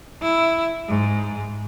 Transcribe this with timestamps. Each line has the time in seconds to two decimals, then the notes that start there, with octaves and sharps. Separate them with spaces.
0.22 E4
0.89 G#2